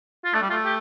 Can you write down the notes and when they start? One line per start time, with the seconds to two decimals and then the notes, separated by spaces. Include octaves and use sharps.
0.25 F4
0.34 A3 D4
0.42 G3
0.50 A3 F4
0.65 G4